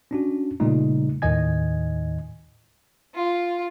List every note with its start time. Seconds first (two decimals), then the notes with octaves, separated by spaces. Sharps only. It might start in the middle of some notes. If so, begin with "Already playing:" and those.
0.11 C#4 D4 F#4
0.60 A#2 C#3 G3 A3 D#4
1.22 D#2 A2 D#3 D#5 G#5 G#6
3.15 F4